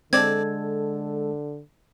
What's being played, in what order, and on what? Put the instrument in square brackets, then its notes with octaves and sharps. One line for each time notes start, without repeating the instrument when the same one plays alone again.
[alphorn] D3 [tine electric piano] G#3 A4 [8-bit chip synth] C4 D5 [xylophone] G#6